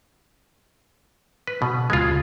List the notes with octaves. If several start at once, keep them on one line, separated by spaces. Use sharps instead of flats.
B4
B2
D2 C#3 G#3 F4 G#6